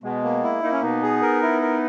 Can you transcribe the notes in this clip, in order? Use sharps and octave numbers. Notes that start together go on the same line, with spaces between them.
B2 G#3 B3
A#3
E4
A#3 D#4
C#4
B2 B3 D#4
G#4
A#4
E4
A#4